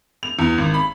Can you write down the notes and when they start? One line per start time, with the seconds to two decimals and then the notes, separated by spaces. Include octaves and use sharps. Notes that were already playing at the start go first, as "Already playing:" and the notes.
0.23 F7
0.39 E2
0.58 G#1
0.74 B5